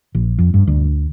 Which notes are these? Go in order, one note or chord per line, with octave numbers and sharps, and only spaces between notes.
A#1
F2
G2
D2